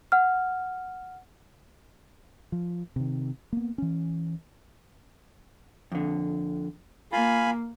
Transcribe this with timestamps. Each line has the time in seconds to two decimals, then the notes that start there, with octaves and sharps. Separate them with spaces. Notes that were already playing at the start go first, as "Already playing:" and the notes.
0.12 F#5 F6
2.52 F3
2.96 C3 D#3
3.53 A#3 B3
3.78 E3 C#4
5.92 F2 D3
7.13 A#3 F4 F5 G#5 B5